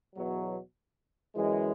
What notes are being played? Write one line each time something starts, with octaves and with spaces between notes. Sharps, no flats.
E2 B2 F#3
F#2 E3 G#3